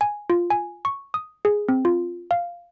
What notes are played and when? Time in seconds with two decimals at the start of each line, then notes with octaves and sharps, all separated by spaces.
0.01 G#5
0.30 F4
0.50 G#5
0.85 C#6
1.14 D#6
1.45 G#4
1.69 C4
1.85 F4
2.31 F5